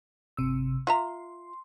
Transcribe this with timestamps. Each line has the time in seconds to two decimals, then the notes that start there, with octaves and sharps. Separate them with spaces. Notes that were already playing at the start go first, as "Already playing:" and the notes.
0.37 G1 C3 E6
0.87 F4 E5 A#5 C6